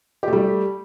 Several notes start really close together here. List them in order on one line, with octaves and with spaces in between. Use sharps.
G4 A3 G3